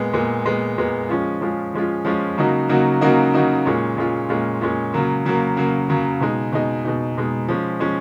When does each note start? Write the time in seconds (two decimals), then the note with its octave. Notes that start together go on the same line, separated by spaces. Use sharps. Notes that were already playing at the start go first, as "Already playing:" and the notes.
Already playing: A#2 G#3 B3
0.13 A#2 G#3 B3
0.45 A#2 G#3 B3
0.78 A#2 G#3 B3
1.09 F3 G#3 C#4 F4
1.41 F3 G#3 C#4 F4
1.74 F3 G#3 C#4 F4
2.05 F3 G#3 C#4 F4
2.38 C#3 F#3 A#3 D#4 F#4
2.69 C#3 F#3 A#3 D#4 F#4
3.01 C#3 F#3 A#3 D#4 F#4
3.34 C#3 F#3 A#3 D#4 F#4
3.65 A#2 G#3 C#4 F4
3.96 A#2 G#3 C#4 F4
4.29 A#2 G#3 C#4 F4
4.61 A#2 G#3 C#4 F4
4.94 C#3 F#3 A#3
5.25 C#3 F#3 A#3
5.57 C#3 F#3 A#3
5.89 C#3 F#3 A#3
6.20 B2 G#3 D#4
6.52 B2 G#3 D#4
6.85 B2 G#3 D#4
7.17 B2 G#3 D#4
7.48 F3 G#3 C#4
7.80 F3 G#3 C#4